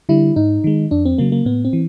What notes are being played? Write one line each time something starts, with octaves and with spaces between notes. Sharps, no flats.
D3 G3 E4
G#2 D#4
D#3 G#3
F2 D4
C4
C#3 F#3 A#3
A#3
A2 B3
C4
E3